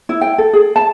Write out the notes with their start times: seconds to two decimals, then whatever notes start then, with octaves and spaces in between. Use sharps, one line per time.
0.09 E4
0.21 G5
0.38 A4
0.53 G#4
0.76 A5